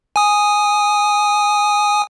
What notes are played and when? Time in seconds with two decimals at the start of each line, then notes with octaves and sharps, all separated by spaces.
0.16 G#5 D#6